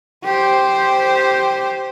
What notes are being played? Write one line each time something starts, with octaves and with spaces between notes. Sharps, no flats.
G4 C5